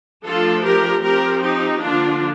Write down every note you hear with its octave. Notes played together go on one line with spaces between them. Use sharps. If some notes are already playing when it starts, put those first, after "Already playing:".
F3 A3 D4 F4 A4
G4 A#4
F3 C4 G4 A#4
D#4 G4
D3 F3 A#3 D4 F4